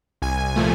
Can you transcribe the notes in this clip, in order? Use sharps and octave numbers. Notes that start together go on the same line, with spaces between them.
C2 G#5
A#2 F3 A3